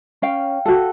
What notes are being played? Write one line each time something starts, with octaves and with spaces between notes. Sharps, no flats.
C#4 F5 G5
F#4 A4